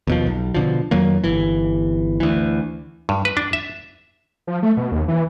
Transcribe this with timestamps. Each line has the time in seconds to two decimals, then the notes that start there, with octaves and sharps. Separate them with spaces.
0.07 D#2 B2 F3
0.26 B1
0.54 B2 D3 F3
0.91 F2 D#3 F#3 A#3
1.24 G1 E3
2.20 D2 E3
3.09 G2
3.25 B4
3.37 D4
3.53 E5
4.47 F3
4.63 A3
4.77 B2
4.92 D#2
5.08 E3